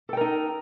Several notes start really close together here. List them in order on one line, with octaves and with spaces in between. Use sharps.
A4 G5 A#4 D#4